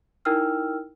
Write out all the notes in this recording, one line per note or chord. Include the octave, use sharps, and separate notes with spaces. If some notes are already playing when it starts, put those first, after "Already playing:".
D#4 E4 A#4 G5 E6 F6